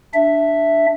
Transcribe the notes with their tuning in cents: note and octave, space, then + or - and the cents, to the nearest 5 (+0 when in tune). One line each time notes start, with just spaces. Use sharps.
D4 +0 E5 +0